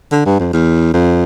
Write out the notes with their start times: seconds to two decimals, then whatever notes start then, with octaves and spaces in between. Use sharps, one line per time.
0.12 D3
0.26 G2
0.40 F2
0.53 E2
0.94 F2